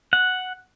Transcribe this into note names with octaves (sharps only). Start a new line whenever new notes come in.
F#5